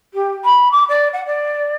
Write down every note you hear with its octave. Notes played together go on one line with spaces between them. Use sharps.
G4
B5
D6
D5
F#5
D5